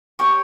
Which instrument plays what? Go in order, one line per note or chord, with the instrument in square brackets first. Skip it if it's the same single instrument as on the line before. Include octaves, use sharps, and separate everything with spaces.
[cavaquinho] G4 C#5 C#6